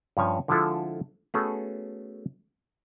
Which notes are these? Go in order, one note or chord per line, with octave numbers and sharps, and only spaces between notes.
G2 F3 C#4 C#5 G#5
D3 F3 G#3 E4 F4 A4
A3 B3 C#4 F#4 G#4 A4